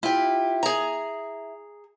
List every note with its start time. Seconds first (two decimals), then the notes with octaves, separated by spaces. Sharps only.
0.03 E4 F4 G4
0.63 G#4 A#5